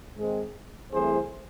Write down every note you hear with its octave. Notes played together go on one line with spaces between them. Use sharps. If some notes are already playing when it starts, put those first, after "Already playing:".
G#2 D#3 G#3 C4
C2 C3 E3 A3 G#4 C5